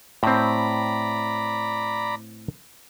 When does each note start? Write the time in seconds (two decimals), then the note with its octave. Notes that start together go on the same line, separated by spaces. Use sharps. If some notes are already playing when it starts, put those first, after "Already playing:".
0.23 A2 C4 D5 A#5 B5